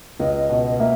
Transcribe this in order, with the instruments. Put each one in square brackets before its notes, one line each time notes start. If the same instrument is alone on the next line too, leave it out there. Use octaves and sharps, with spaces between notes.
[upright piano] C#2 [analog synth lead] D#5
[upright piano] B2
[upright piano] A#3 [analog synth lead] E5